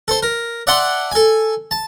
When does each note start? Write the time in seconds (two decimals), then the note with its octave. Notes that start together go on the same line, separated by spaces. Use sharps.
0.08 A4 C5
0.23 A#4
0.67 D5 E5 F#5 G5 A5 C6
1.11 A4 G#5
1.71 A5